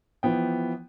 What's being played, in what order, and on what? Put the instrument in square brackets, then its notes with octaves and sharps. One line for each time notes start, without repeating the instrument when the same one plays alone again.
[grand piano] E3 F3 B3 G5